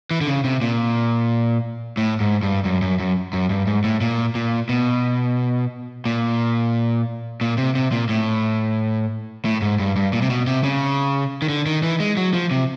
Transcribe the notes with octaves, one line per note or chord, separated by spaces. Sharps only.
E3
D3
C#3
C3
A#2
A2
G#2
G2
F#2
F#2
F#2
F#2
G2
G#2
A2
A#2
A#2
B2
A#2
A#2
C3
C3
A#2
A2
A2
G#2
G2
G2
A#2
C3
B2
C3
C#3
D#3
D3
D#3
E3
G#3
F#3
F3
C3